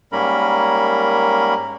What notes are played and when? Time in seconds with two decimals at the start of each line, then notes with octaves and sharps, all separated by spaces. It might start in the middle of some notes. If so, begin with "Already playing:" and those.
0.12 G#2 G3 A#3 C#4 A#4 B5